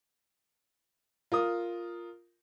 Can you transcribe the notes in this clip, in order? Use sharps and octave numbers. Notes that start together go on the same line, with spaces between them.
F4 A#4 D#6